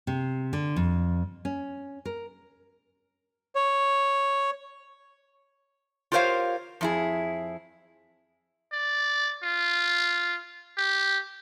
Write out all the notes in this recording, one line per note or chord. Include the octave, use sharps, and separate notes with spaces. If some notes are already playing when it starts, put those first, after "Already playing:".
C3
D3
F2
C#4
A#4
C#5
F4 G4 A#4 C5 C#5 F5
F2 E4 G#4
D5
F4
G4